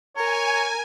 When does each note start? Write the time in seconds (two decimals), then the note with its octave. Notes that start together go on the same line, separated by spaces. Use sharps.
0.16 A#4 C#5 G#5